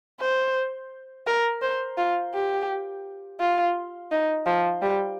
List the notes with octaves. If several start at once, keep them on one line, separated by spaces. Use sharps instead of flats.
C5
A#4
C5
F4
G4
F4
D#4
F3
G3